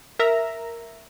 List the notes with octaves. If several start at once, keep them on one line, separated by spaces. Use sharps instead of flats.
A#4 E5 A#5